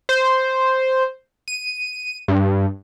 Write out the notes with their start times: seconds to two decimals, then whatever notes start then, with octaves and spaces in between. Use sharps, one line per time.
0.09 C5
1.48 D#7
2.28 G2